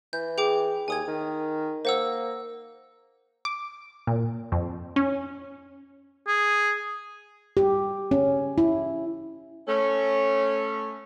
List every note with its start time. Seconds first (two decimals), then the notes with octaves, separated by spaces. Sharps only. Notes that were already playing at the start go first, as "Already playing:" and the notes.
0.13 E3 G6
0.38 G#4 G5 D6
0.88 D#2 G#5 D#6 G#6
1.08 D#3
1.85 A#3 C5 F#5 E6
3.45 D6
4.07 A#2
4.52 F2
4.96 C#4
6.27 G#4
7.57 G4
8.11 C#4
8.58 E4
9.68 A3 C#4